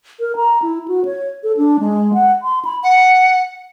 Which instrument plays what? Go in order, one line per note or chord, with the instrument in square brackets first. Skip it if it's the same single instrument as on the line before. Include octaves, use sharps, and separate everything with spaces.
[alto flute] A#4
A#5
E4
F#4
C#5
A4
D4
G#3
F#5
C6
B5
[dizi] F#5